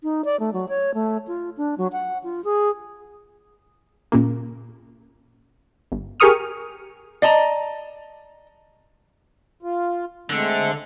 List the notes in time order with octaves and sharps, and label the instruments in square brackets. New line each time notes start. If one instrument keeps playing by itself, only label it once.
[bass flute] D#4
D5
A3
F#3
C#5
A3
F4
D4
F#3
F#5
F4
G#4
[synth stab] A#2 C#3 A#3
G1
G4 G#4 A#4 C#6 D#6 F6
[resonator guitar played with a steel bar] D5 D#5 A5 A#5
[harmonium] F4
[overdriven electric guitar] D3 [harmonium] G#3 A3 C4